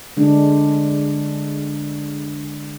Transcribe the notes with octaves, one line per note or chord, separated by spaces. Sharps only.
D3 G#3 D4